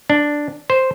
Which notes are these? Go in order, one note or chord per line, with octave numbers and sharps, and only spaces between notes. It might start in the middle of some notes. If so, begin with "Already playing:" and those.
D4
C5